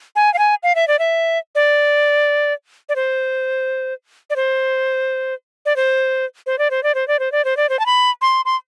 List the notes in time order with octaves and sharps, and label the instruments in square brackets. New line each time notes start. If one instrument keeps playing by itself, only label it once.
[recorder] G#5
F5
G#5
F5
E5
D5
E5
D5
D5
C5
D5
C5
D5
C5
C5
D5
C5
D5
C5
D5
C5
D5
C5
D5
C5
A5
B5
C6
C6